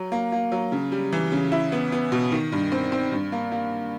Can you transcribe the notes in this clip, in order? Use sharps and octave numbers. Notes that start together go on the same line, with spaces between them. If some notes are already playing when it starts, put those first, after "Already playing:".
Already playing: F#3
A#3
A#3
F#3
C#3
G3
E3
C#3
E4
B3
B3
B2
D#3
G2
C4
C4
G2
A#3
A#3